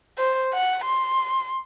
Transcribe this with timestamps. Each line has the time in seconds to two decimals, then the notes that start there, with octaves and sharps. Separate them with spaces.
0.18 C5
0.54 F#5
0.85 C6